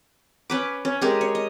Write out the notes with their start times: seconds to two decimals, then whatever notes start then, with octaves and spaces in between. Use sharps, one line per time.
0.50 C#4 B4 D6
0.85 C#4
1.01 G#3 G4 G#4 A#4
1.21 C#5
1.35 D#5